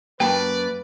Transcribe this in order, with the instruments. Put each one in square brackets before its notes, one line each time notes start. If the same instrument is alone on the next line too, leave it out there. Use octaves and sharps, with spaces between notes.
[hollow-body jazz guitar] F#2 A#3 A5 [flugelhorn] B4 [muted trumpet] D5 [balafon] G5